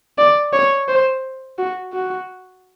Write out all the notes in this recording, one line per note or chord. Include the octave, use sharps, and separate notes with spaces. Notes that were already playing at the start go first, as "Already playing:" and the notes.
D5
C#5
C5
F#4
F#4